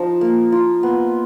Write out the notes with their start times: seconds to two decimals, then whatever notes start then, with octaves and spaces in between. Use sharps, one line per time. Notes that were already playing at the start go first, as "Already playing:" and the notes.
Already playing: F3 D#4
0.21 A#3
0.52 F4
0.83 B3